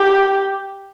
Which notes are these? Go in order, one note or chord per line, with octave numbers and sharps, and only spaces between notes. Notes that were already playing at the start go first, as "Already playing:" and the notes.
Already playing: G4